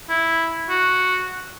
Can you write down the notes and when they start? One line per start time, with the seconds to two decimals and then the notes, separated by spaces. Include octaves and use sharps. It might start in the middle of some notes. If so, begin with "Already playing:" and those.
0.09 E4
0.69 F#4